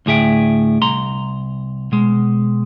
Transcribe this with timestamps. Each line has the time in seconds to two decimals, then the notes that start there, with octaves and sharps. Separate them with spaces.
0.06 D2 A2 G#4 E5 G5
0.82 C2 A#5 C6
1.92 B2 G#3